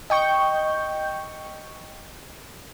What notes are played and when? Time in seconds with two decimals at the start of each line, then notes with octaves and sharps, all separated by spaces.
0.10 D#5 G5 C#6 G6